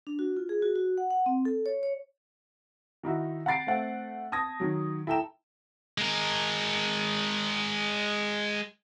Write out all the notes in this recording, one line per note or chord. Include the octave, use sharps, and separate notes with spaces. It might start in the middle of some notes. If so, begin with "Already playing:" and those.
D4
F#4
F4
G#4
F#4
F#4
F#5
F#5
C4
A4
C#5
C#5
D#3 D#4 E4 F#4
F#5 A#5 B5 A6 C7 D7
A3 C4 F#5
A5 D#6 G#6 A#6
D#3 F#3
E4 A4 G5 A#5 E7
G#3 A#4